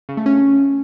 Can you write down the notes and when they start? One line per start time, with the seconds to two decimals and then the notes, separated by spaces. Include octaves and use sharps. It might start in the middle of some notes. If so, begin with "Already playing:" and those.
0.09 C#3
0.17 A3
0.26 C#4